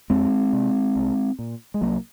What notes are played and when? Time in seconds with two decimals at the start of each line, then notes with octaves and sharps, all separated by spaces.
0.10 F2 G#3 C4
0.53 C3
0.96 C2
1.39 A#2
1.74 G#3
1.81 C2 F#3 A#3